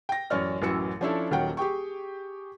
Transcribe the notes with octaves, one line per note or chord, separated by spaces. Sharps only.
G5 A#6
A1 F#2 C#4 C#5 D5 F6
A1 F#2 E3 F#3 E6 C#7
F3 C#4 D4 E4 A4 C#5
D#1 D#3 F#3 C#4 F#5 G5
G4 G#4 G5 C#6